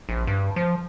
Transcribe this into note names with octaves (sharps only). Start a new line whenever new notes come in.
A#1
G2
F3